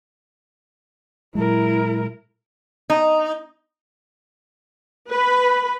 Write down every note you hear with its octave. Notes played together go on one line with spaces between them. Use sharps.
A#2 F#3 G#3 E4 A#4
D#4
B4 B5